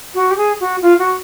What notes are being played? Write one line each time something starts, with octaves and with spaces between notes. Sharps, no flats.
F#4
G4
G#4
F#4
F4
F#4